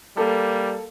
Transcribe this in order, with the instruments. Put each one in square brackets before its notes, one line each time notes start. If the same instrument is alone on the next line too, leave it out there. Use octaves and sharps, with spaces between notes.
[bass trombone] G3 [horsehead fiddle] A#3 [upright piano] A4